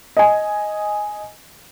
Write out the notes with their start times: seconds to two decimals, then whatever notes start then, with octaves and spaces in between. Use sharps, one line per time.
0.17 D#5 G#5